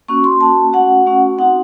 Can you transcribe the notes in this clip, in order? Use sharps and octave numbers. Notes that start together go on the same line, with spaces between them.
A#3 C#4 F#4 C#6
C6
A#3 C#4 F#4 A5
A3 C#4 F#4 F#5
A3 C#4 F#4
C4 D#4 F#4 F#5